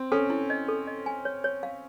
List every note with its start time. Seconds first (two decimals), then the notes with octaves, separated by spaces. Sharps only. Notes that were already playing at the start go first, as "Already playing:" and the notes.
Already playing: C4
0.12 C#4 A4
0.30 E4
0.50 D#5
0.68 A4
0.87 D#5
1.06 G#5
1.25 C#5
1.44 C#5
1.63 F5